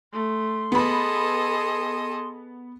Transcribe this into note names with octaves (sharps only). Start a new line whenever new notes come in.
A3 C6
B3 G#4 A4 D#5 B5